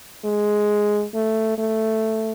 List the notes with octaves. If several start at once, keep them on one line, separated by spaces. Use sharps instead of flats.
G#3
A3
A3